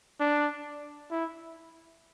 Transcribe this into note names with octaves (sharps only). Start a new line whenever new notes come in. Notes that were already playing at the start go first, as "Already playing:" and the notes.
D4
E4